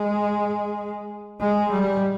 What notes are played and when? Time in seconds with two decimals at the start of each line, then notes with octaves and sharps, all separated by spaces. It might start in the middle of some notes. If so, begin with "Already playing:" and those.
Already playing: G#3
1.40 G#3
1.70 G3